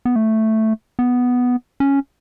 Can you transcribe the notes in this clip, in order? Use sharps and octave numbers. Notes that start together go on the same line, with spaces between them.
B3
A3
B3
C#4